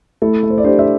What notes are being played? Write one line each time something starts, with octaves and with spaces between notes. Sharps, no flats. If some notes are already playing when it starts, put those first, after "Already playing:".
A3 E4 A4
A3
C5
D5
D4 G4 C5
C5 E5